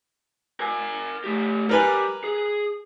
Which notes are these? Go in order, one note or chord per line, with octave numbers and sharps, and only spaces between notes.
A#4 G#5
A3 G4
G3 A#4 B4 G#5
G#4